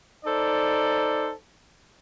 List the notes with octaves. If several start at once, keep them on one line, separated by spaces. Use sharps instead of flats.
D#4 A4 C5 D5